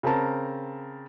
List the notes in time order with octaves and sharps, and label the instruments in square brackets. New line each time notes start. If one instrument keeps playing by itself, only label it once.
[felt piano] C#3 C4 A#4 A5 A#5